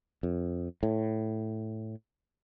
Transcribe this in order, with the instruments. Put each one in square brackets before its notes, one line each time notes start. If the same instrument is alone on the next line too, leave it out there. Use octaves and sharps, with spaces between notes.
[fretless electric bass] F2
A2